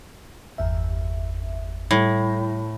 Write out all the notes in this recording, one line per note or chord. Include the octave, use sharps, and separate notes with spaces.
G1 E2 E5
A2 G3